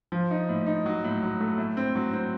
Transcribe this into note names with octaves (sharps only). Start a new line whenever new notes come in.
F3
D#4
A2
D#4
F#3
A2
F#3
A3
A2
C4
F#3
C4